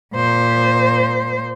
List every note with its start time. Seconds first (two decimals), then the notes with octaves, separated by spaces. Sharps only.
0.15 A#2 C5